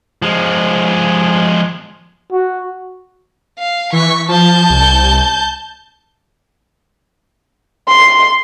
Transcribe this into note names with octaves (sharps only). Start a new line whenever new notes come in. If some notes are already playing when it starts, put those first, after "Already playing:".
F3 G#3
F#4
F5
E3 C#6 B6
F3 A5 G6
C2
C6